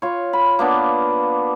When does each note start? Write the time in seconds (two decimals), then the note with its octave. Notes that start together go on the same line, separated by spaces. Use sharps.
0.02 F4 C#5
0.33 B5
0.59 A#3 B3 D4